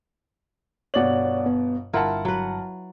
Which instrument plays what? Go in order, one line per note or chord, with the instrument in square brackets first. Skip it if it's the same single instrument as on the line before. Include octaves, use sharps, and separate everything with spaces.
[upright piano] G1 B2 F#7 [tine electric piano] C#5 D5 F#5
[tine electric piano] B3
[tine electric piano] G1 G2 [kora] E4 F4 [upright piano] A#4 F#5 A5
[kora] F#3 B4